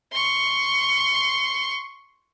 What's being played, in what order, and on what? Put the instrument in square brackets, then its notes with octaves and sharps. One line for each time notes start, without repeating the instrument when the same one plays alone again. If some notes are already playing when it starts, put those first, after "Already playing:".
[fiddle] C6 C#6